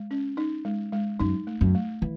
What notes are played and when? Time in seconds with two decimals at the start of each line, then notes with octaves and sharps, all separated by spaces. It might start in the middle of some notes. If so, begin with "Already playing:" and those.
Already playing: G#3
0.11 C#4
0.37 D#4
0.65 G#3
0.92 G#3
1.20 F#2 D#4
1.47 A3
1.61 F#2
1.75 A3
2.02 E3